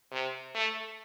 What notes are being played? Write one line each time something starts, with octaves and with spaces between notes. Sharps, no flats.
C3
A3